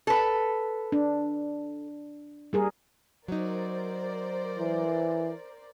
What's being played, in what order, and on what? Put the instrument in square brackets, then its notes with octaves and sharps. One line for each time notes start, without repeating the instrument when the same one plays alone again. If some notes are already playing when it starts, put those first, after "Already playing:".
[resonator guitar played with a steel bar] A4 B4
[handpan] D4
G3 G#4 A#4
[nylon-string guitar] F#3 D#4 [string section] A#4 C5 D5
[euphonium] E3